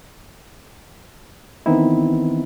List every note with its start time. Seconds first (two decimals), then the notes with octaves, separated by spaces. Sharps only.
1.66 D#3 E3 B3 C4 D#4 E4